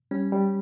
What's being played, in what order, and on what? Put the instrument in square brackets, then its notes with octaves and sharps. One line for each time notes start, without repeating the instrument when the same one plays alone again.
[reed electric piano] G3 [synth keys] C#4
[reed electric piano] G3